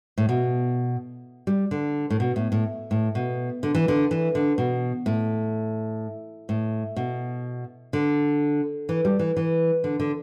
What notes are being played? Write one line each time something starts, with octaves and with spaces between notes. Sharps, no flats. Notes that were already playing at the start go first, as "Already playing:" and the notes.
A2
B2
G3
D3
A2
B2
A2
A2
A2
B2
D3
E3
D3
E3
D3
B2
A2
A2
B2
D3
E3
G3
E3
E3
D3
D3